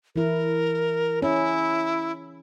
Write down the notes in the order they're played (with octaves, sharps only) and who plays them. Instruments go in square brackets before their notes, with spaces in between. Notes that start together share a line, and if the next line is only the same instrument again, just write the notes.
[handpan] E3 E4 [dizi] A#4
[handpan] C#4 [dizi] E4